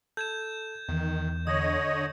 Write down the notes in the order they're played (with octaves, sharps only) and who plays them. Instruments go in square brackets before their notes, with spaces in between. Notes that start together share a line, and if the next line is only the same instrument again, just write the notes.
[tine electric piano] A4 [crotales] G6 G#6 E7
[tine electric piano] E2 [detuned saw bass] D#3
[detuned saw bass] D3 [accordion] C#5 D#5 [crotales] D#6